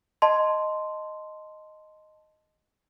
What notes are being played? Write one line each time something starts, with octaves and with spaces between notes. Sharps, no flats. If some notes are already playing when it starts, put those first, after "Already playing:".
D#5 A5 C6